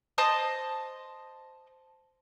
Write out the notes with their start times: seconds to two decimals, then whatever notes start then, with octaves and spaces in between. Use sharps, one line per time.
0.18 C5 D#5 A5 D#6